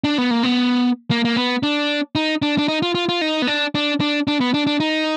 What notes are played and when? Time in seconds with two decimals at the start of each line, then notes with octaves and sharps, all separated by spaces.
0.04 D4
0.18 B3
0.31 A#3
0.43 B3
1.11 A#3
1.25 A#3
1.36 B3
1.63 D4
2.15 D#4
2.42 D4
2.58 D4
2.68 D#4
2.82 F4
2.95 F4
3.09 F4
3.21 D#4
3.42 B3
3.47 D4
3.75 D4
4.00 D4
4.27 D4
4.41 B3
4.54 D4
4.67 D4
4.80 D#4